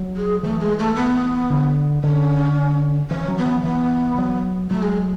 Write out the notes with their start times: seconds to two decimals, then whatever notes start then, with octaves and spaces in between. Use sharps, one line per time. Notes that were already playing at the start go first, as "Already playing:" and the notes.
Already playing: F#3
0.16 G#4
0.43 E3 A3
0.60 G#3
0.79 A3
0.96 B3
1.50 D3
2.03 D3 C#4
3.11 E3 C#4
3.28 F#3
3.38 B3
3.46 E3
3.64 E3 B3
4.18 F#3
4.71 F#3 A3
4.82 G#3